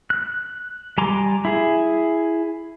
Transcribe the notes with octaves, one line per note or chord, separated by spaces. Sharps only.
F#6
G3 G#5 A#5 C6 D6
E4 G#4